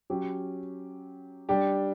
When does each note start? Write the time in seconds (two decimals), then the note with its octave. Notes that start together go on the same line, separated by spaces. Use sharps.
0.10 F#3 C#4 G4
1.49 G3 D4 G4